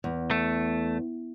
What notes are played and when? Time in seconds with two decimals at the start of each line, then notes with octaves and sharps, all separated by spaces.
0.04 E2
0.31 A3